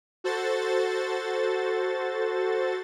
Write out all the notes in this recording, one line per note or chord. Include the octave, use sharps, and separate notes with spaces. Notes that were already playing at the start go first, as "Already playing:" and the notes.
F#4 A4 C5 A6